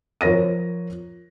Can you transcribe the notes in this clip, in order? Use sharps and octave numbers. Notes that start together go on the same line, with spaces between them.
F3 A#4 C#5 A#6 D#7